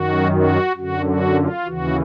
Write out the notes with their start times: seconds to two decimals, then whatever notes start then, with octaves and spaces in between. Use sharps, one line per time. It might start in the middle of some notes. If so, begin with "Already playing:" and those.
Already playing: F#2 D#3 F#4
0.32 F#4
0.76 F#2 D3 F#4
1.06 F#4
1.36 F4
1.65 D#2 C#3 E3 F#4